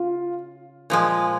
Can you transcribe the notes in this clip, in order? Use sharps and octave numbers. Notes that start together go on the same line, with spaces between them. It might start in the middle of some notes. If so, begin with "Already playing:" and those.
Already playing: C#3 F4
A#2 F3 G#3